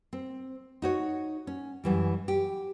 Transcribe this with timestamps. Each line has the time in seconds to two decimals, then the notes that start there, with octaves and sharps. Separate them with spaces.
0.13 C4
0.82 D#4 F#4 C#5
1.47 C#4
1.84 F#2 E3 G3
2.28 G4